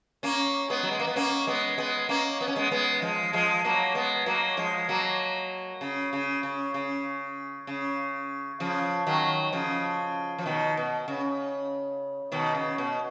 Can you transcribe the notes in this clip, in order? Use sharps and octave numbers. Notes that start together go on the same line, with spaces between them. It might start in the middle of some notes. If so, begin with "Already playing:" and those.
A#3 C#4
G#3 B3
F#3
G#3
A#3
B3
A#3 C#4
G#3 B3
G#3 B3
A#3 C#4
B3
C#4
G#3 B3
G#3 B3
F3 G#3
F3 G#3
F#3 A#3
G#3 B3
F#3 A#3
F3 G#3
F#3 A#3
C#3
C#3
C#3
C#3
C#3
C#3 F3
D#3 F#3
C#3 F3
F3
B2 D#3
B2
C#3
B2 D#3
C#3
B2